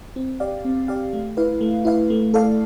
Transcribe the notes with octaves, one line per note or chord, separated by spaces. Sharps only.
C4
G4 D5 F5
C4
G4 D5 F5
A3
E4 B4 F5
A3
E4 B4 F5
A3
E4 A4 D5 F5